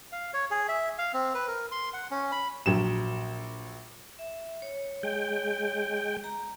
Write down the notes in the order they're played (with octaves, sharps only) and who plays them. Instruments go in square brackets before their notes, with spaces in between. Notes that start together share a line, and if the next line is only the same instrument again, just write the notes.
[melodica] F5
C#5
G#4
E5
F5
C4
B4
A#4
C6
F#5
C#4
B5
[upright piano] A#1 F#3 E7
[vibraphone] E5
C#5
[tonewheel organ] G#3 G5
[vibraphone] A#5